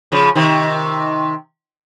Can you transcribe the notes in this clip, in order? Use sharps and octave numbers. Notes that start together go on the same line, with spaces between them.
C#3 F3
C3 D#3